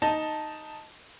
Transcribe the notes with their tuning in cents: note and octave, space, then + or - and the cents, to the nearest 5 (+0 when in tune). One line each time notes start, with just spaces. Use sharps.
D#4 +0 D#5 +0 A5 +0